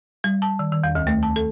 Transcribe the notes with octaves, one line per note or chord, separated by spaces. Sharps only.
G3
A5
D#3
D#3
E2
D2
A3
A5
A4